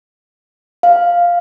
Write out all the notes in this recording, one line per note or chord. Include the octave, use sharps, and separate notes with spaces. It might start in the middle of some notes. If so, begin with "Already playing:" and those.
F5